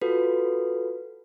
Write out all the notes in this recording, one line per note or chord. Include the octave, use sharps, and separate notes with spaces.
F4 F#4 A4 B4